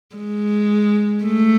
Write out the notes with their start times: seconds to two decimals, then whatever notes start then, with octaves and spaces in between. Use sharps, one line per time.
0.16 G#3
1.24 A3